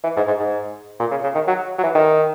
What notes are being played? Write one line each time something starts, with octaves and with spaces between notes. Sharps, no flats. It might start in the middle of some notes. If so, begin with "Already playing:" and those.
E3
G#2
G#2
G#2
A#2
C#3
C#3
D#3
F#3
F#3
E3
D#3